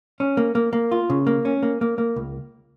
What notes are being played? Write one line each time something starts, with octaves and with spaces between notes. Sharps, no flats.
C#4
A#3
A#3
A#3
F4
C#3
A#3
C#4
A#3
A#3
A#3
C#2